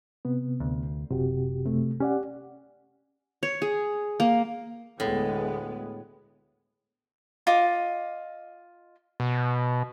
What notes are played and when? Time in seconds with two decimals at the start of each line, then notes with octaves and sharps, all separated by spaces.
0.25 C3 B3
0.60 D2
1.10 F#1 C3 F#4 G4
1.66 C3 A3
2.00 C#4 G4 D5 F#5
3.43 C#5
3.62 G#4
4.20 A#3
5.00 D2 A2 G#3 B3
7.47 F4 D#5 D6
9.20 B2